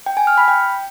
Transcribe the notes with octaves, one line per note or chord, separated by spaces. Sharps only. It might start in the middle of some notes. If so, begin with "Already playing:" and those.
G5
G#5
F6
B5
G5